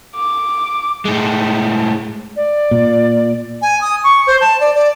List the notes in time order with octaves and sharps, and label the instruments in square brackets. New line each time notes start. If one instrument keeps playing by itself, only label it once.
[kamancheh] D6
[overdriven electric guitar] A2 G#3
[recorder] D5
[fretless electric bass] A#2
[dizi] G#5
D#6
C#6
C5
A5
D5
D5